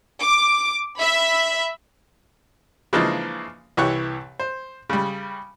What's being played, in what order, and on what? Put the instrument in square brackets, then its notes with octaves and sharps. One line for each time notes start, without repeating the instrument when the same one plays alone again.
[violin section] D6
E5 B5
[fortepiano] C#3 E3 F3 G#3 A#3 D4
C2 E3 G4 C#5 C#6 F#6
C5
C#3 G3